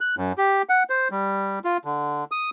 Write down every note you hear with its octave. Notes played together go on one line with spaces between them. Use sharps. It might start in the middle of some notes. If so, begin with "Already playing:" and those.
F#6
F#2
G4
F#5
C5
G3
F4
D3
D#6